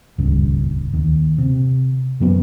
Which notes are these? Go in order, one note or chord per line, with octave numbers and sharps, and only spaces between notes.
D#1 C#2 G2
D#2
C3
F#2 F#3 B3